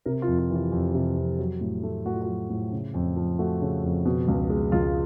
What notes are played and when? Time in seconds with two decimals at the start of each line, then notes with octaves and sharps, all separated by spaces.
0.05 C3 A#4
0.22 F4
0.28 F2
0.39 F4
0.50 E3
0.56 F4
0.72 F2
0.95 C3
1.17 F2
1.39 F#3
1.61 A2
1.83 A3
2.06 A2 F#4
2.14 F4
2.22 F#4
2.28 F#3
2.50 A2
2.72 C#3
2.94 F2
3.16 F3
3.39 A3 F#4
3.61 C#3
3.84 F2
4.05 B2
4.28 C#2
4.50 G#3
4.72 C#2 F4